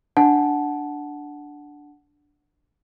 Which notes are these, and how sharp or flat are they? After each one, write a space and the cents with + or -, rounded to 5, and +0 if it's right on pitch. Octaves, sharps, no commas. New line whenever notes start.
D4 +0 F#5 +0 A5 -20